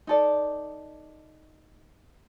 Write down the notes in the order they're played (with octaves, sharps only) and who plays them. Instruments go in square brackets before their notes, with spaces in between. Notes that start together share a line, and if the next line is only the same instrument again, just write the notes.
[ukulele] D#4 A4 D5